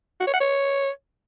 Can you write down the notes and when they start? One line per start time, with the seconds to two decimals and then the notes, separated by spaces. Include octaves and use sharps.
0.20 F#4
0.27 C#5
0.34 F#5
0.40 C#5